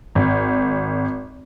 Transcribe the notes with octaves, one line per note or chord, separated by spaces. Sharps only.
G#1